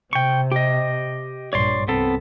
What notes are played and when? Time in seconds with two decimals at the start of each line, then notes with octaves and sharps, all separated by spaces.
0.13 C3 G5 C#6
0.52 G4 D#5
1.53 A#1 G2 C#5 D5 C6
1.88 C2 B3 C4 A4